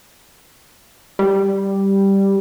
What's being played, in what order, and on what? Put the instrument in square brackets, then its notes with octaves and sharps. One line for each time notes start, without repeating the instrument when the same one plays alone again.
[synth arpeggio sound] G3